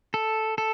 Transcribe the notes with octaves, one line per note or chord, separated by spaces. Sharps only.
A4
A4